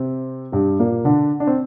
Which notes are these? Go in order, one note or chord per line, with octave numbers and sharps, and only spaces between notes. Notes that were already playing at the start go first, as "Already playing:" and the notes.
Already playing: C3 C4
G2 G3
A#2 A#3
D3 D4
D4
C4